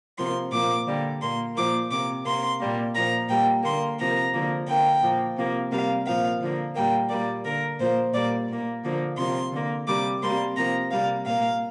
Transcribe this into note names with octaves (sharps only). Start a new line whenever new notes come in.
C3 F3 A#3 C6
A#2 F3 A#3 D6
D3 G3 A#3
A#2 A#3 C6
A#2 F3 A#3 D6
C3 A#3 D6
C3 A#3 C6
A#2 G3 A#3
A#2 F3 A#3 A#5
A#2 G3 A#3 G5
D3 A#3 C6
C3 F3 A#3 A#5
D3 F3 A#3
D3 A#3 G5
A#2 F3 A#3
C3 F3 A#3
C3 G3 A#3 F5
A#2 F3 A#3 F5
D3 F3 A#3
A#2 G3 A#3 G5
A#2 G3 A#3 D5
D3 A#3 A#4
A#2 F3 A#3 C5
A#2 G3 A#3 D5
A#2 A#3
D3 F3 A#3
C3 F3 A#3 C6
D3 A#3
C3 G3 A#3 D6
C3 G3 A#3 C6
C3 F3 A#3 A#5
C3 G3 A#3 F5
A#2 A#3 F5